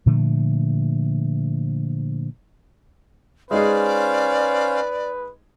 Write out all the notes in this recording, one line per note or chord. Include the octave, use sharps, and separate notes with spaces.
A#2 D3 F3 A3
G#3 C#4 D#4 G#4 B4 C5 D5 F5